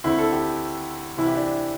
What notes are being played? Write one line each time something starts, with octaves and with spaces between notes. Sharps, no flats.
D2 D3 C4 E4
A4
G4
C2 C3 E3 E4
G4
D4